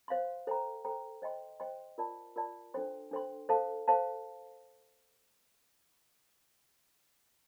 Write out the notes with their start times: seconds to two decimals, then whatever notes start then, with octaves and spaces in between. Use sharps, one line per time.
0.08 C5 F5 C6
0.47 A4 C5 G5 A#5
0.85 A4 C5 G5 A#5
1.22 C5 D#5 G5 C6
1.60 C5 D#5 G5 C6
1.98 F4 A#4 D5 A5
2.36 F4 A#4 D5 A5
2.74 D4 A4 C5 G5 C6
3.11 D4 A4 C5 G5 C6
3.49 A4 C5 F5 A5
3.88 A4 C5 F5 A5